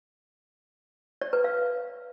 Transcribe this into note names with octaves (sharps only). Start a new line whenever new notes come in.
D5
B4
F5